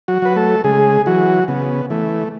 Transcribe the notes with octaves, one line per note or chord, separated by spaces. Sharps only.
F#3 F#4
F#3 B4
A3 A4
C#3 G#3 G#4
E3 F#3 F#4
C#3 B3
E3 A3